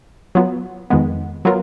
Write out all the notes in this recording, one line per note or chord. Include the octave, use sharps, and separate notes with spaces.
F#3 B3 F4
F2 D#3 G#3 B3
F#3 B3 F4 A#4